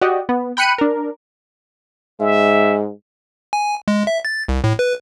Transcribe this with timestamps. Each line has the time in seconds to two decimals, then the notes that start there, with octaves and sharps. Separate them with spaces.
0.01 F#4 G4 D5 D#5
0.29 B3
0.57 G5 B5 F#6 C#7 D#7
0.78 D4 A#4
2.20 G#2 G#3 E5
3.53 G#5
3.88 G#3
4.07 E5
4.25 A6
4.48 C2
4.64 A2
4.79 B4